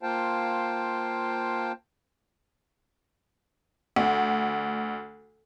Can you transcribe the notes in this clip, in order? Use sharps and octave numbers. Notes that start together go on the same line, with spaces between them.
A#3 F4 C5 F5 G5 A5
D2